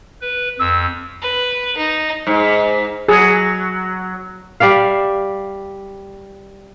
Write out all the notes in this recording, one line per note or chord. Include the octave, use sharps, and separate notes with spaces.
B4
F2 E6
B4
D#4
G#2
F#3 G#4
G3 D5 E5 F5